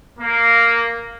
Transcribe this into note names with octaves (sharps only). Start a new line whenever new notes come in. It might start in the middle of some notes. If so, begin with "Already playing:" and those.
A#3